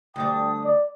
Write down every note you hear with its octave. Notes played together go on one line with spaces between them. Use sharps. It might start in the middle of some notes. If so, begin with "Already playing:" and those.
D2 G3 D4 G5 D#6
D5